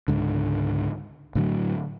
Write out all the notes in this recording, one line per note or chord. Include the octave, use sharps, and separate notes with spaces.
C#2 G#2 D3
A2 D3 F#3